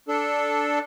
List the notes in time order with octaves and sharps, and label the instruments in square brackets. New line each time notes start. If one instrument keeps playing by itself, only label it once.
[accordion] D4 A4